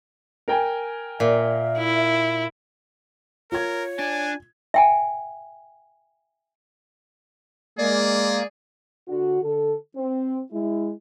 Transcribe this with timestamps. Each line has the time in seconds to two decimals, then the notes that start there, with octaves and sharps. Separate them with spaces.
0.48 A#4 G5 G#5
1.20 A#2 E5
1.78 E4
3.52 F4 A#4 C#5 G#6
3.99 D4 G#5
4.74 E5 G5 G#5
7.79 G#3 A#3 G#4 D5
9.08 D3 F#4
9.43 D3 A4
9.96 C4
10.52 G#3 E4